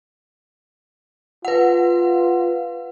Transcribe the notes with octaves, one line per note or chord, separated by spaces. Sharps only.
F4 B4 F#5